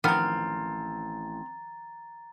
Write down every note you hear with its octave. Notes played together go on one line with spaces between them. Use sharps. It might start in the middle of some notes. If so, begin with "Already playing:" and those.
A1 D#3 F3 B3 C4 A#5 F6 A6